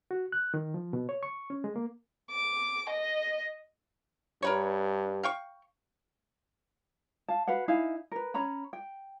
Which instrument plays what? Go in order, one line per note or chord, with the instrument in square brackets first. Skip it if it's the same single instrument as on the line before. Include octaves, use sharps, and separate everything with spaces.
[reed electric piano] F#4
F#6
D#3
F3
B2
C#5
C#6
C#4
G#3
A#3
[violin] D6
D#5
[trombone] G2 [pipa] A#4 B4 C#5
[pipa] F5 G5 C#6
[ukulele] F5 A5
F#4 B4 F5 F#5
D#4 E4 F5 G#5
A#4 B4
C#4 C#5 A#5 B5
G5